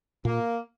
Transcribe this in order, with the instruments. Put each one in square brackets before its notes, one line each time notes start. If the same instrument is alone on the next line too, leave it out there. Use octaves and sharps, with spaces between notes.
[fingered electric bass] A#2 [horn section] A#3